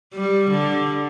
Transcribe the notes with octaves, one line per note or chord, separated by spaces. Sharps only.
G3
D3